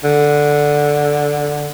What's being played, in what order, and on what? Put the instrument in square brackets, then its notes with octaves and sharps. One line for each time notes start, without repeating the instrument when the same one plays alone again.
[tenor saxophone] D3